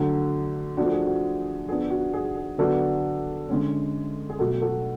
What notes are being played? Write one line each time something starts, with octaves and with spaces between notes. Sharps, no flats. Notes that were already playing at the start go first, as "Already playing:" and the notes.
Already playing: D3 F#3 A3
F3 A3 D4 F#4
G#4
F#4
F3 B3 D4 G#4
F#4
G#4
G#4
D3 F#3 B3 D4 F#4 A4
D3 G#3 C#4
G#4
B2 F#3 A3 F#4 A4
F#4 A4